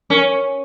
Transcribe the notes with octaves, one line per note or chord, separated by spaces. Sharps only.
C#4 A#4